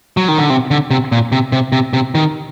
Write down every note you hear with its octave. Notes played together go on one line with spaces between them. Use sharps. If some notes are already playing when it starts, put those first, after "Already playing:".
F#3
D#3
D3
C3
D3
C3
A#2
C3
C3
C3
C3
D#3